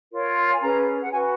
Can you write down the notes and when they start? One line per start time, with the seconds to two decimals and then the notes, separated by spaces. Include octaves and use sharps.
0.10 F4 A#4 C#5
0.52 G#5
0.60 C#4 G#4 B4 A#5
1.01 F#5
1.11 F#4 B4 G#5